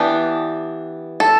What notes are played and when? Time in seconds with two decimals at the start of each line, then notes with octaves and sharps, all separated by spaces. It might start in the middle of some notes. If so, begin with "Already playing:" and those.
Already playing: E3 B3 D4 G4
1.20 A4